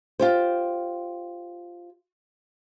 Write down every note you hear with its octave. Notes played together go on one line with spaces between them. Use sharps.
F4 G4 C5